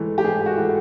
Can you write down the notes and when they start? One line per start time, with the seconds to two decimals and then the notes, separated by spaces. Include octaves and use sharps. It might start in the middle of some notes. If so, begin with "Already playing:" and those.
Already playing: G#2 E3 A3
0.18 G4
0.24 G#2 G#4
0.46 F#4
0.57 E3 A3